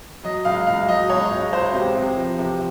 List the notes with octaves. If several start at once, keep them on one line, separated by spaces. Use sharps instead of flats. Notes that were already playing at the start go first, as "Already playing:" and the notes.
F#3 D#5
C#2 F5
C#2 F5
F#3 D#5
C#2 C#5
C#2
C#2 C5
C3
C3
F3
C3